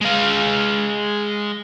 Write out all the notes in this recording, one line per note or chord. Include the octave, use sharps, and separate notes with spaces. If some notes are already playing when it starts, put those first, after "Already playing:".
G#3 F5